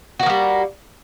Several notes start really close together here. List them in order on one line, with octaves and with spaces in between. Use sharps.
F#4 A#3 F3 G3